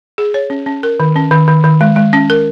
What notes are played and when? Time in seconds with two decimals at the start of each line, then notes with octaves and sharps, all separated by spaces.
0.18 G#4
0.34 C#5
0.50 C#4
0.66 C#4
0.83 A#4
1.00 D#3
1.16 C#4
1.31 D#3
1.48 D#3
1.64 D#3
1.81 G#3
1.96 G#3
2.13 C#4
2.30 A#4